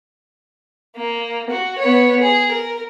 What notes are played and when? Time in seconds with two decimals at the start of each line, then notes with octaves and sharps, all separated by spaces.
0.97 A#3
1.50 F#4
1.79 B3 C#5
2.20 G#4
2.52 A#4